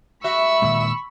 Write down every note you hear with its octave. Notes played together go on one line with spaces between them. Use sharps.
F#4 E5 B5 C#6 E6
A#2 D#3 G#3